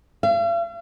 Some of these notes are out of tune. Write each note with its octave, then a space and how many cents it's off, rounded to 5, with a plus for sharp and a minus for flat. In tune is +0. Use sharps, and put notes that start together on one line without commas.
F5 -45